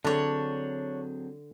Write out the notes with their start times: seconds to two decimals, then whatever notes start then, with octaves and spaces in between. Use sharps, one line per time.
0.05 D3 F#3 C4 D4 G#4 C#5